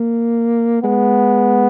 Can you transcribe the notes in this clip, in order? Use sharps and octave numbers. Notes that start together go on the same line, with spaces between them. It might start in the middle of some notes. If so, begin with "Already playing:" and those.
Already playing: A#3
G#3 B3